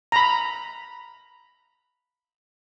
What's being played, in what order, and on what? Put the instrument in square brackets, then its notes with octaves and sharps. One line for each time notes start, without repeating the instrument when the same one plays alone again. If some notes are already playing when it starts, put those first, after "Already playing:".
[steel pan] A#5 B5